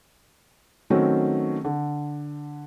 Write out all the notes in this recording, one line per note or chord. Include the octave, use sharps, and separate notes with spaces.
D#3 F#3 A3 C4 C#4
D3